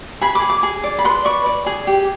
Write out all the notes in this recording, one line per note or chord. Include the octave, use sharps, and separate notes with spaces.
G#4 B5
D6
G#4
D6
G#4
D5
B5
B4 C6
D5 C#6
D5
G#4
G4